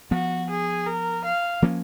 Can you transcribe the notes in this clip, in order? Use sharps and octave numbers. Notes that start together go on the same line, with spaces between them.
F3 B3 F#4
G#4
A#4
F5
F3 A#3 C#4